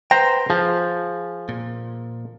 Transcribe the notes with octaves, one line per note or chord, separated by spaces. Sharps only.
B4 C5 G5 A#5
F3 G#4
A#2